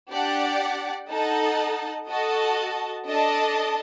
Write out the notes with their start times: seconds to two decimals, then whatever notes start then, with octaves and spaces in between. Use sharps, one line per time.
0.10 D4 G4 D5 F#5
1.10 D#4 A4 D#5 F#5 A5
2.08 F#4 A4 D#5 A5
3.07 D4 A4 D#5 A5